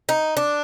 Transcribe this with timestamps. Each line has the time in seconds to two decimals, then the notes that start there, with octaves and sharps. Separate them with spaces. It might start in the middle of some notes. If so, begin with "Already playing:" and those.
0.09 D#4
0.37 D4